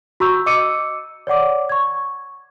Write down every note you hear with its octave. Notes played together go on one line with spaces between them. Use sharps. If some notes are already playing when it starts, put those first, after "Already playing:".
F#4 A#5 C#6 E6 G6
D#5 D6 E6 C#7 D#7
C#5 D5 F#5 D6
C#6 G#6